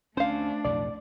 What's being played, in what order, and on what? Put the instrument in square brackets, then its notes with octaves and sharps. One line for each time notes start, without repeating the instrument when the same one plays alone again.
[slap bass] D2 C#4 [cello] A3 D4 [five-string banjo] C5 F5
[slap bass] B1 F2 A2 [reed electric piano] D5